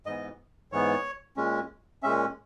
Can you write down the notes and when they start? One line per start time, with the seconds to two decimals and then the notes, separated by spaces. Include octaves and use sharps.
0.06 G#2 E3 B3 D#5
0.72 G#2 E3 B3 C#5
1.37 A#2 G#3 C#4
2.03 A#2 G#3 C#4 E5